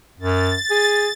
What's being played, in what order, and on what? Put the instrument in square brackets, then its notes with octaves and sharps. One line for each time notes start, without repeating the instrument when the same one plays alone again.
[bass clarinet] F#2 [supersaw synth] A6
[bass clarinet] G#4